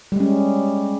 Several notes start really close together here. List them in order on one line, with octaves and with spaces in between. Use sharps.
G3 G#3 C#4